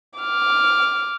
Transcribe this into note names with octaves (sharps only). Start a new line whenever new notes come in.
D6 F6